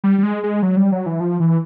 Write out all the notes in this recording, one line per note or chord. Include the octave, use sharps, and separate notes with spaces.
G3
G3
G#3
G#3
F#3
G3
F#3
E3
F3
E3